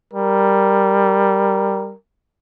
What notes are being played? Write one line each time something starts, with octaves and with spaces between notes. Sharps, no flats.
G3 A#4